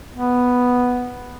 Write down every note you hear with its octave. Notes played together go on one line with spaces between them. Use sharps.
B3